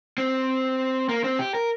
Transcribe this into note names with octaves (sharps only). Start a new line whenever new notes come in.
C4
A#3
C4
G4
A#4